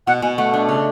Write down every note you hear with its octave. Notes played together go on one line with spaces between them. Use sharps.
B2 F#5
B2 G#5
A3 F#5
D4
C#3